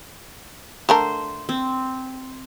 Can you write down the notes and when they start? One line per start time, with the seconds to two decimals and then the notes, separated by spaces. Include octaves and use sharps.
0.89 D3 A3 A#4 C5 A5
1.49 C4